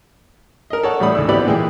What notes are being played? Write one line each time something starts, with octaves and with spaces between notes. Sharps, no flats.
A#4 D#5
A4 C#5 F#5
A2 G3 A3 D4 B5 D#6
D2 G#2 E6
B3 C4 E4 G4 D5 B5
A#2 E3 G#3 E4 G5